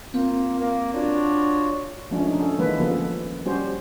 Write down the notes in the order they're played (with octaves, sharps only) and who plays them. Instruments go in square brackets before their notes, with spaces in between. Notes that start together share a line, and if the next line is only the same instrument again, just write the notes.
[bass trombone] A#3 [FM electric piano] C4 [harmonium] F4
[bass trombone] A#3
[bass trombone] D4 [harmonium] F4 F#4 C#5
[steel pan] F3 G#3 A3 C#4 D4
A3 D4 D#4
C#4 A4
D#3 E3 G#3 A#3 B4
C#3 F3 A#3 B3 G#4 A4
G3 C#4 F#4 G4 C5